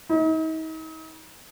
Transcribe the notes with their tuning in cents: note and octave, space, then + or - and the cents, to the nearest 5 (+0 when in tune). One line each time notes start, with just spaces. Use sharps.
D#4 +40